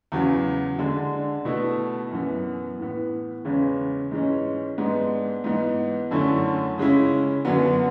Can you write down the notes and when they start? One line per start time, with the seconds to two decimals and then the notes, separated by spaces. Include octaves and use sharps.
0.12 E2 C#3 F#3
0.79 D3 G#3 D4
1.45 B2 A3 E4
2.11 F#2 E3 B3
2.78 A2 E3 B3
3.45 E2 C#3 G#3 C#4
4.11 G#2 E3 G#3 C#4
4.78 G#2 G#3 B3 D4
5.44 G#2 E3 B3
6.11 F#2 D3 A3 C#4 E4
6.78 C#3 G#3 C#4 E4
7.45 F#2 D3 F#3 B3 D4